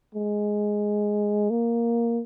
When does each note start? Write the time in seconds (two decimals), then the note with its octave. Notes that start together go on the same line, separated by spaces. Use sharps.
0.14 G#3
1.50 A#3